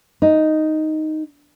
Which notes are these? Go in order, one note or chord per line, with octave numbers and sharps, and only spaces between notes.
D#4